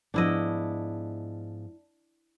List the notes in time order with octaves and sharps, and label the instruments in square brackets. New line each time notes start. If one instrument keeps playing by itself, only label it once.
[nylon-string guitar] G#2 F3 B3 [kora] D4 E4 D#5